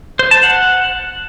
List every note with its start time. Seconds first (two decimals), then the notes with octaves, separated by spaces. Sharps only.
0.19 C5
0.31 A5
0.43 F#5